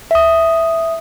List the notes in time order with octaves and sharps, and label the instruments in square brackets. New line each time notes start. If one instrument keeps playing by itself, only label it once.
[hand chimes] E5 D#6